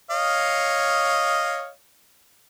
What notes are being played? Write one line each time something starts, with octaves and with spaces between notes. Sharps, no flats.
C#5 D#5 F5